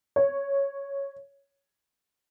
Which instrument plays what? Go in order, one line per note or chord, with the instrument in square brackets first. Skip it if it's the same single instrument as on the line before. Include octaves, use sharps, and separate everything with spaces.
[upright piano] C#5